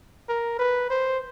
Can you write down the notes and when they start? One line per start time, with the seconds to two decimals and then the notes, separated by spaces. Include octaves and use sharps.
0.29 A#4
0.59 B4
0.90 C5